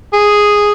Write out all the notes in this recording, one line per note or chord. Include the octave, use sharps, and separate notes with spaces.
G#4